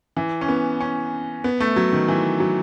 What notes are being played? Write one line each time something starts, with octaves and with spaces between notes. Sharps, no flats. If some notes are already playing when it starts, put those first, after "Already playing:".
E3
C#4
B3
C#4
B3
A3
F#3
D#3
E3
F#3